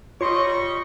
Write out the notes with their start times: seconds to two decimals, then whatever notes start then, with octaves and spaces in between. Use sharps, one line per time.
0.21 G3 F4 C#5 D#5 C6 C#6